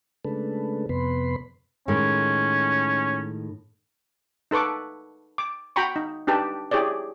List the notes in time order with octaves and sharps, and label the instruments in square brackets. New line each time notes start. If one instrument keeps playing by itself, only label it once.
[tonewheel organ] C#3 G#3 A3 D4 A4 B4
F2 C3 B3 B4 B5 C6
[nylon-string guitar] A2 D#3 G#3 [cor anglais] C#4
[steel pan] D#4 A4 B4 C#6 D6
D6
F#4 G5 A#5 B5 C#6
D#4
D4 D#4 G4 B4 A5
E4 G4 G#4 C#5 D5